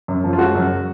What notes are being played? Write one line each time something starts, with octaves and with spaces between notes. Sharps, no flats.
F#2
F3
F4
G#3 F#4
F#2